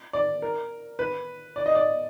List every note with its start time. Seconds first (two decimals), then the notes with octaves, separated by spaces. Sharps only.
0.13 D5
0.42 A#4
0.99 B4
1.56 D5
1.66 D#5
1.75 D5